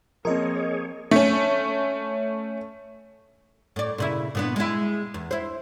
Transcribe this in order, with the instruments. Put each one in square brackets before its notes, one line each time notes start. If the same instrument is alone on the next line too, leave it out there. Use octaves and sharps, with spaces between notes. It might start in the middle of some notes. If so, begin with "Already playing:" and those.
[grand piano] F3 C4 [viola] A#3 [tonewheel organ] G#4 C#5 [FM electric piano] A#4 D#5
[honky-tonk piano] A3 C#4
[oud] A2 D5
A#2 C#3 E4
A#2 B3 D4
G#3 E4
E2
E4 C5